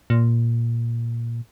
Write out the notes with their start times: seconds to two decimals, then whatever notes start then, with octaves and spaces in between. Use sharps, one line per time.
0.10 A#2